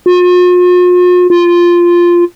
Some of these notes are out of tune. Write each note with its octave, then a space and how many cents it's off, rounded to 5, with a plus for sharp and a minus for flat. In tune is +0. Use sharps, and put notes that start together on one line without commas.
F4 +45
F4 -5